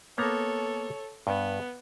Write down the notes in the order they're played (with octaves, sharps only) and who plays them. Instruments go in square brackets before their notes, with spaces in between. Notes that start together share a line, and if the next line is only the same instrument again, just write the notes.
[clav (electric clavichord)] A#3 B3 A#5 [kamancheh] A4 C#5
[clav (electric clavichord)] G2 [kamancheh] B3